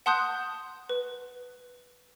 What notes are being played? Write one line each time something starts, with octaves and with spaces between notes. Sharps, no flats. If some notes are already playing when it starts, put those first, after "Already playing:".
F#5 A5 C6 D#6 F#6 G6
B4